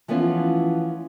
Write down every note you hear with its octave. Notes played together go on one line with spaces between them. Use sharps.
E3 F3 A3 B3 C#4 F4